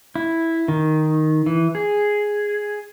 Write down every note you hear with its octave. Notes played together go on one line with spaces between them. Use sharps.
E4
D#3
E3
G#4